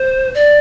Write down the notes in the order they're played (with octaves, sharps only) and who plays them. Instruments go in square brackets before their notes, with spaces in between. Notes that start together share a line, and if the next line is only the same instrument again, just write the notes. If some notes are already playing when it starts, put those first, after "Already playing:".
Already playing: [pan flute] C5
D5